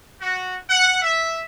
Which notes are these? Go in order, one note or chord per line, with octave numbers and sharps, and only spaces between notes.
F#4
F#5
E5